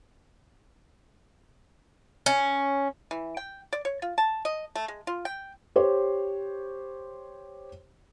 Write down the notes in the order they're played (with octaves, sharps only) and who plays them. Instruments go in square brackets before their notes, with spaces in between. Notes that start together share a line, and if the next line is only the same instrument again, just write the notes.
[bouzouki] C#4
[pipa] E3
G5
D5
C#5
F4
A5
D#5
A3
G#3
F4
G5
[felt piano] G4 C5 C#5